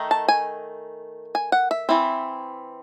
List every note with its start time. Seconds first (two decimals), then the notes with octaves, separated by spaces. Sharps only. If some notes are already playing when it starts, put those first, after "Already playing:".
Already playing: D#3 A3 D#4
0.11 A5
0.28 G#5
1.35 G#5
1.52 F#5
1.71 E5
1.89 E3 C4 E4